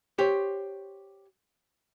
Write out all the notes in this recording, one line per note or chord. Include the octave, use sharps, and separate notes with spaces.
G4 C5 C#5